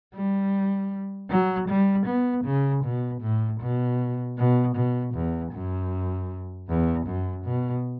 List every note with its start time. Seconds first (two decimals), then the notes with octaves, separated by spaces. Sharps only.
0.14 G3
1.30 F#3
1.68 G3
2.06 B3
2.45 C#3
2.84 B2
3.22 A2
3.61 B2
4.37 B2
4.76 B2
5.14 E2
5.53 F#2
6.68 E2
7.07 F#2
7.45 B2